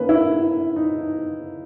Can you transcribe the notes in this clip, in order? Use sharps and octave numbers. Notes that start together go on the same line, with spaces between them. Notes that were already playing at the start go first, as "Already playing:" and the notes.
Already playing: D#3 A#3 C#4 B4
E4
D#4